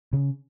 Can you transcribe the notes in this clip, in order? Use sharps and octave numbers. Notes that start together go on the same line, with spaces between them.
C#3